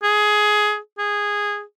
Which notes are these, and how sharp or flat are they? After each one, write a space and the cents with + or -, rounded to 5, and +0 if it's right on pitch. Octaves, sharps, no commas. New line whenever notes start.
G#4 +15
G#4 -10